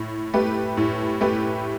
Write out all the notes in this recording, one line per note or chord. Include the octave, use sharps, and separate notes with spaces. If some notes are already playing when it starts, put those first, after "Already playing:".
Already playing: A2
A3 G4 B4
A2
A3 G4 B4